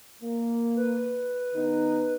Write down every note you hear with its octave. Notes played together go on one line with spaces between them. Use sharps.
A#3
B4
D#3 B3 D#4